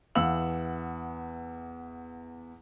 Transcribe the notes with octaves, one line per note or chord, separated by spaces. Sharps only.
E2 E3 F5 F#5 E6 F#7